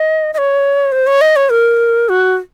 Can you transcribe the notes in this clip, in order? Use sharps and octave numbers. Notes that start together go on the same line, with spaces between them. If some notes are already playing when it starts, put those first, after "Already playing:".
Already playing: D#5
D#5
C#5
C5
C#5
D#5
C#5
A#4
F#4